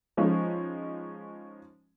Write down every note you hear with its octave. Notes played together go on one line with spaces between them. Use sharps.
F3 G#3 C#4 D#4